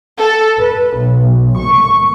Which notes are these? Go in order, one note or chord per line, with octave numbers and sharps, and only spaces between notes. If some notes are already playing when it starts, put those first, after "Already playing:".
A4
B4
B1
C#6